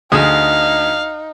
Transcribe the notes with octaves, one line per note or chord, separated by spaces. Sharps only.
D2 D#4 G#4 F5 D#6